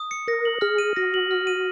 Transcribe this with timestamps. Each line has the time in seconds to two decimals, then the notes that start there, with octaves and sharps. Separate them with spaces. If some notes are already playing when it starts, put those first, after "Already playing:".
Already playing: D#6
0.11 C#7
0.27 A#4 A#6
0.45 F#7
0.61 G#4 F6
0.78 D#7
0.96 F#4 A#6
1.14 F#7
1.31 F6
1.47 D#7